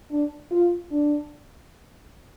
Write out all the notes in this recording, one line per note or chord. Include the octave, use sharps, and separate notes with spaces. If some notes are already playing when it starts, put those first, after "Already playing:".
D4
F4
D4